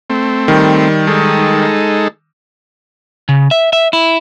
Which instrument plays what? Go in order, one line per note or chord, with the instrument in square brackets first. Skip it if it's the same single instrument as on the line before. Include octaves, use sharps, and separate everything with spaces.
[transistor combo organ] A3 C4
[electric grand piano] D#3 G3
[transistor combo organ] G#3 D#4 A4
[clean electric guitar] C#3
E5
E5
E4